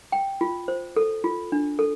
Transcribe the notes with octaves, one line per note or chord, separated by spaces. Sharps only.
G5
F4
C5
A4
F4
D4
A4